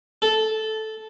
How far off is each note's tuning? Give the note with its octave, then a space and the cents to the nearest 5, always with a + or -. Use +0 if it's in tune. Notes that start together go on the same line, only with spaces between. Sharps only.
A4 -10